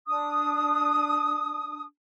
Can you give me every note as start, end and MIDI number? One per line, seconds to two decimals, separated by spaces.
0.07 1.84 62
0.07 1.84 87